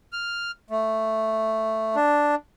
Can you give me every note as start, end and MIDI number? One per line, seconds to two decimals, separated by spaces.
0.13 0.51 89
0.70 1.96 57
1.96 2.35 62